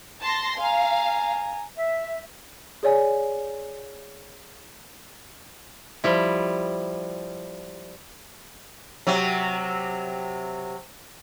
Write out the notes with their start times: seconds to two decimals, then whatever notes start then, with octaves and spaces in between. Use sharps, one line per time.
0.21 A5 C6 A#6
0.59 F5 G#5 A#5
1.76 E5
2.83 G#4 C#5 D5 G#5
6.04 F3 G3 E4
9.07 C3 F#3